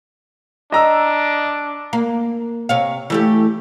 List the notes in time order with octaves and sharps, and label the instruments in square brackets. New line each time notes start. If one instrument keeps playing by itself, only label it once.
[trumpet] D4 [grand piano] D#5 A#5 E6
[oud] A#3
C3 C#5 F5
E3 A3 G4